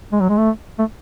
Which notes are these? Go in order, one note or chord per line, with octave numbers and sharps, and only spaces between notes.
G#3
F#3
G#3
A3
A3